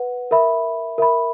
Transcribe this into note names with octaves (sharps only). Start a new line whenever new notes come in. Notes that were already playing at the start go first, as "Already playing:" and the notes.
Already playing: B4 F#5
A#4 E5 B5
A#4 E5 B5